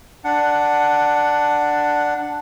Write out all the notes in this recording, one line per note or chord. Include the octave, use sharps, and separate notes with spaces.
D4 F#5